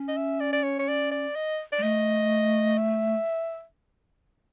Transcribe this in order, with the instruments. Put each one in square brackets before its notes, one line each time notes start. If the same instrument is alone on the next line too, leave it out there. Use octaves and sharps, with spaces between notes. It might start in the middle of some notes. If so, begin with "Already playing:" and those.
Already playing: [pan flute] C#4
[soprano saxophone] D#5
E5
D5
D5
C#5
C#5
D5
D5
D#5
D5
[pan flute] G#3
[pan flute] A3 [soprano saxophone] D#5
[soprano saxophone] E5